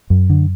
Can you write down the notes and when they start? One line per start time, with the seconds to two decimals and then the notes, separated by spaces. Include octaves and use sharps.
0.10 F#2
0.30 D3